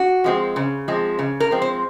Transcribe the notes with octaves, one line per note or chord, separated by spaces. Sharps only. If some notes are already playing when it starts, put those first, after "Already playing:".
Already playing: F#4
F3 G#3 C4
C#3
F3 G#3 C4
C#3
A#4
F3 G#3 C4
C5